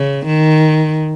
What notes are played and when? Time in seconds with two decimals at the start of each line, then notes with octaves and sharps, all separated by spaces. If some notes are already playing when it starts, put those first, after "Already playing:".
Already playing: C#3
0.26 D#3